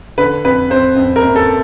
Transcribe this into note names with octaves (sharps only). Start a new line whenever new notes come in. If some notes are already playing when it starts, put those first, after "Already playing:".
D3 B4
F2 B4
F2 C5
F2
A#4
F#1
A4